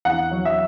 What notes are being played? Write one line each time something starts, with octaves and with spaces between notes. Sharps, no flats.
E2 F#5
F#3
E5